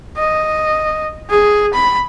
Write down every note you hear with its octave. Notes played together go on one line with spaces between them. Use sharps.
D#5
G#4
B5